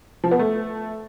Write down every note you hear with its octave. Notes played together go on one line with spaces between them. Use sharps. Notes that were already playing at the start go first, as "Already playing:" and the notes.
F3
B3
A3